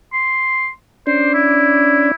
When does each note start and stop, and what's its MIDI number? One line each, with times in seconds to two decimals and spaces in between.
0.13 0.69 84
1.07 2.12 61
1.07 2.12 62
1.07 1.29 72
1.07 2.12 74
1.34 2.15 64